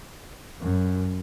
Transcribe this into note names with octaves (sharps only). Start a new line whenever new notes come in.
F#2